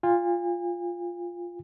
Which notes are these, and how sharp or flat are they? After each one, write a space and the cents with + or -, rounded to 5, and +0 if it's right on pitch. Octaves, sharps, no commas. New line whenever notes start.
F4 +0 G#5 -40